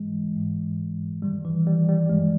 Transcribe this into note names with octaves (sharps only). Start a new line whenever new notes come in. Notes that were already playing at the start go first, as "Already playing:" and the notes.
Already playing: G#2 E3 G#3
G#2 E3
G2 D#3 G3
E3
G3
G3
G2 D#3 G#3